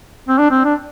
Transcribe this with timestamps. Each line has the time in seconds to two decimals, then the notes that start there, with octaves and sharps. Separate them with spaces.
0.29 C4
0.38 D4
0.51 C4
0.64 D4